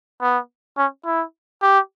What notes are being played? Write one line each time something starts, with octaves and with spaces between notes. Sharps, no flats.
B3
C#4
E4
G4